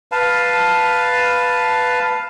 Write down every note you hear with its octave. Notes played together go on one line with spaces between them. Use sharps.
B4 F5 A5